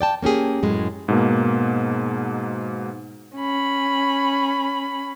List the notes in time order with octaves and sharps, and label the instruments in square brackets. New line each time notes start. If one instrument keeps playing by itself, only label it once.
[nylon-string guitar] D5 G5 A5
A#3 C#4 G4 G#4
F#2 A2 G#3
[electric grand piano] G#2 B2 A#3
[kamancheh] C#4 B5